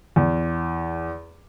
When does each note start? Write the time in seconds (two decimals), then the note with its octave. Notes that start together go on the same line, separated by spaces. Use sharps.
0.16 E2